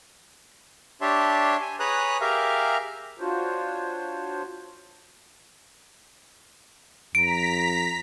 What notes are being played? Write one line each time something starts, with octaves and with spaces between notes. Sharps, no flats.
D4 G4 C#5 E5 A5 C6
G#5
G#4 B4 C#5 A#5 D#6 F#6
G4 G#4 A#4 E5 F5 A#5
D4 F4 F#4 C5 C#5
F2 A#5 B6 D7